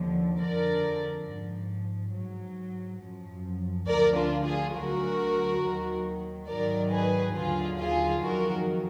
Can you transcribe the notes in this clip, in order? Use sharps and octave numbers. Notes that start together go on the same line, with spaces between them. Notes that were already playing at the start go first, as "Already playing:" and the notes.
Already playing: D#2 D3 F3
F2 D3 F3 A#4 D5
G#2 F3
G#2 F#3
F#2 F3
D2 D3 F3 A#4 D5
D4 F4
F4 G#4
D2 D3 F#3 F#4 A#4
D#2 D#3 F#3
G#2 D#3 F#3 A#4 D5
G#4 B4
D#2 D3 F#3 F4 G#4
F4 G#4
F2 D#3 F#3 F#4 A#4